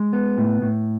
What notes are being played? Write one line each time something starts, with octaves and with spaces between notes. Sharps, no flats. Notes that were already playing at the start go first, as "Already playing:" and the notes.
Already playing: G#3
B3
A2
A2